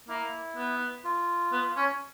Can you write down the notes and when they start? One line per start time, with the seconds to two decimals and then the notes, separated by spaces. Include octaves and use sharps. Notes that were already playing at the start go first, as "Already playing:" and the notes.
0.08 A#3 E4
0.57 B3
1.04 F4
1.52 B3
1.77 C#4